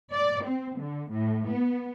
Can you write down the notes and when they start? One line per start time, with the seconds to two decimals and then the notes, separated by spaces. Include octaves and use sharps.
0.14 D5
0.46 C4
0.79 D3
1.12 A2
1.48 B3